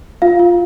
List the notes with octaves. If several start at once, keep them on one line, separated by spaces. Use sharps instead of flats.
F4 F5
F4